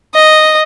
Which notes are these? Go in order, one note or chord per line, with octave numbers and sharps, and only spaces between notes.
D#5